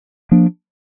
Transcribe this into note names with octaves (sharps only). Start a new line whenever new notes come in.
F3 A#3 D4